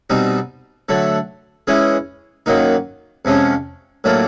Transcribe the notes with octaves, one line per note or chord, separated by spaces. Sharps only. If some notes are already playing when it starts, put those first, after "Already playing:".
B2 G3 C4 D#4
D3 F#3 A3
E3 G#3 C#4 E4 G#4
F#2 D#3 F#3 A#3 D#4
F2 C3 F3 G#3 C#4
A2 F#3 A#3 D4 F4